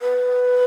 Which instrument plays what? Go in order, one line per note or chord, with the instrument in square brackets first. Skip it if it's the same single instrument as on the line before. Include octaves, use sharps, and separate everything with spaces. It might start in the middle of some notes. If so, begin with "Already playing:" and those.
[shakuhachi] B4